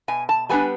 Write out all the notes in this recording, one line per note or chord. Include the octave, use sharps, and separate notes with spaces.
B2 G#5
A5
G3 B3 D4 G#5